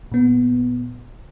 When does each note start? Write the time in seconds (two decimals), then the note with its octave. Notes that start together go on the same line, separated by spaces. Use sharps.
0.12 A#2 B3